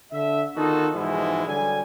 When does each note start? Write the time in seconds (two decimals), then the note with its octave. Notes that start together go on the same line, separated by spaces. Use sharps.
0.11 D3 E5
0.55 D#3 B3 D#4 F4 F#4 A4
0.93 G#2 B2 E3 F3 G#3 E4
1.46 D3 F#3 G3 G4 G#5